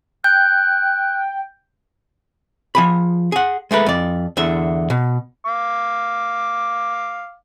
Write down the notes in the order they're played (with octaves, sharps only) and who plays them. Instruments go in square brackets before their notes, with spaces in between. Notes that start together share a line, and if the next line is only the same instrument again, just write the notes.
[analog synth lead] G5 [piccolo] F#6 [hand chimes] G6
[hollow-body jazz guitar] F3 G#4 B5
G#4 F#5
G#3 A3 A#4 B4
F2 D5
E2 D3 E5
B2
[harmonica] F5 D6